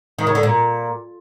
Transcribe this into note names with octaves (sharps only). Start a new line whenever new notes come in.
D#3
C#3
D3
A#2